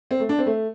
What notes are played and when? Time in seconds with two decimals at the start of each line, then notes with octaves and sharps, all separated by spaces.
0.11 C4
0.20 A3
0.29 D4
0.38 C4
0.46 A3